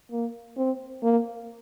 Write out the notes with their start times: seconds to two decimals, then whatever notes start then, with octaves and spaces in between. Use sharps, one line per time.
0.12 A#3
0.57 C4
1.03 A#3